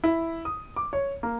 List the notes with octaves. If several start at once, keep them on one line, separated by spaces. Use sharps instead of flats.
E4
D#6
D6
C#5
A#3